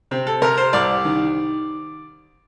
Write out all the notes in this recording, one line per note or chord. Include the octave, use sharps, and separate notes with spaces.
C3 C4
A4
C3 A#4
C5
C2 D5
D#3